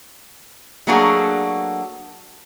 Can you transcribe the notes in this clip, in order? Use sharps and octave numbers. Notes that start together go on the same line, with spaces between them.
F#3 A3 A#3 D4 F#4 G#4